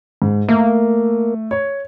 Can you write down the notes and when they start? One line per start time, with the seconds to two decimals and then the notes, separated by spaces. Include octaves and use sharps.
0.22 G#2
0.49 A3 A#3
1.51 C#5